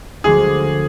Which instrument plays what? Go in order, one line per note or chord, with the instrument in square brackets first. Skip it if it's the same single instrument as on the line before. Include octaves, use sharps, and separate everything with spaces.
[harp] D2 D3 F3 G#3 [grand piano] G#4